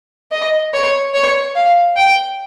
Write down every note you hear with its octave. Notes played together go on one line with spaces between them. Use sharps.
D#5
C#5
C#5
F5
G5